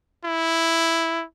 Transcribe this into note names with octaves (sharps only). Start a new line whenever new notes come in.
E4